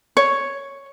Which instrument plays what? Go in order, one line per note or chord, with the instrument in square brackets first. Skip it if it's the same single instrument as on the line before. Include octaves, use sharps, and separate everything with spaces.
[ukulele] C#5